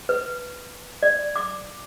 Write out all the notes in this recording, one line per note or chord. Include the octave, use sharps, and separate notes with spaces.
B4
D5
D6